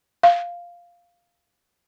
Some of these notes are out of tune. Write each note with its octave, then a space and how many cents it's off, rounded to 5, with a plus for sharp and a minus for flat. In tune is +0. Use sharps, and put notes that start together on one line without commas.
F5 +0